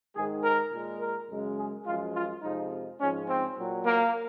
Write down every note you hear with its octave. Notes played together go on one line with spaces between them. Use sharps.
G#2 D#3 G#3 G#4
A#4
A#2 G#3
A#4
F#2 C#3 G#3
G#4
F#2 F3 G#3 F4
F4
F2 C3 F3 G#3 D#4
G#2 F3 G#3 C#4
C4
A#2 F#3
A#3